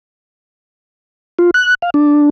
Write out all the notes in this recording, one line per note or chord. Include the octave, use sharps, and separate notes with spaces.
F4
F#6
F5
D4